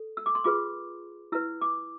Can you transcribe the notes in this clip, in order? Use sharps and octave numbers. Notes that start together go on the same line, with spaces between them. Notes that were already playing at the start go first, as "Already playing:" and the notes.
Already playing: A4
E6
D6
C6
F4 G#4 B4 D6
E4 B4 E6
D6